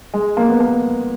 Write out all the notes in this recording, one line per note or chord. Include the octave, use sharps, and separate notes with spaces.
G#3
A#3
B3
A#3